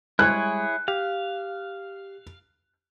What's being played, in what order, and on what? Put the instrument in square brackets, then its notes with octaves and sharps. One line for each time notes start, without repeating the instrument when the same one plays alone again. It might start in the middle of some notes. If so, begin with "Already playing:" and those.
[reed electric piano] G3 G#3 [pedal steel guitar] E4 G#4 C#5 [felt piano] F#6
[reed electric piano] G4 [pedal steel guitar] F5